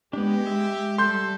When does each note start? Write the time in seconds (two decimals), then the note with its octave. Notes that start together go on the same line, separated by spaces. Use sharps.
0.13 G#3 B3 D4 G4
0.47 E5
0.98 G3 A4 C6 G6